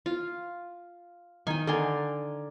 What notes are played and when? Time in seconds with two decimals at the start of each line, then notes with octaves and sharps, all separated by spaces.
0.06 F4
1.47 D#3 G5 G#5
1.67 D3 A#4 D5 G#5 C6